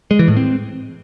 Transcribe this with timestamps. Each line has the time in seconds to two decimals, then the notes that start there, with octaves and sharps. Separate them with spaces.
0.11 G#3
0.19 E3
0.28 A2
0.37 C4